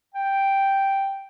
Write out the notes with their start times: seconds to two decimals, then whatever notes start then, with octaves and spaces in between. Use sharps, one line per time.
0.15 G5